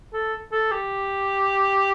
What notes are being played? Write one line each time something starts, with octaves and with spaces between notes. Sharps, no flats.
A4
A4
G4